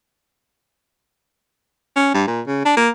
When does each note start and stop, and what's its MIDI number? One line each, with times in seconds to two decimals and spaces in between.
1.96 2.14 61
2.14 2.23 43
2.27 2.41 46
2.47 2.63 49
2.66 2.73 62
2.77 2.89 58